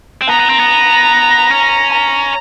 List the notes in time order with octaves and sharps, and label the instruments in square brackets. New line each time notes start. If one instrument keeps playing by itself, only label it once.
[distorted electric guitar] C4
[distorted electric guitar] B3 [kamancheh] A#5
[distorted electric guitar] B3
C4
B3
C#4
[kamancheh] A#5